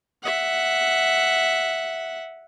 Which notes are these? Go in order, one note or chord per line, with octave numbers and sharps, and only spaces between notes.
E5 F#5